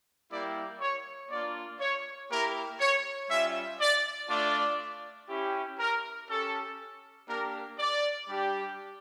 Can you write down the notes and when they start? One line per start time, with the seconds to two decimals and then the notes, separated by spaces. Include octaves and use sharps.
0.31 G3 A#3 E4 G4 D5
0.81 C#5
1.30 A#3 D4 F4 D5
1.80 C#5
2.31 A#3 E4 G4 A#4
2.80 C#5
3.30 G3 C#4 F4 E5
3.80 D5
4.29 A3 D4 F4 D5
5.29 C#4 E4 G4
5.79 A#4
6.29 C#4 G4 A4
7.28 A#3 D4 G4 A#4
7.79 D5
8.28 G3 D4 G4